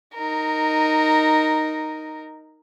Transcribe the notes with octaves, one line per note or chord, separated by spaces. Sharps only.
D#4 A#4